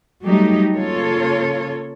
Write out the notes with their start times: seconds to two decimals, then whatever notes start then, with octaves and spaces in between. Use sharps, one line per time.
0.22 F#3 G3 A3 D#4 G4
0.76 C#3 A#3 F4 A4 C#5